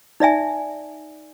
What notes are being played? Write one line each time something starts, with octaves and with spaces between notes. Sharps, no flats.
D#4 D5 E5 G#5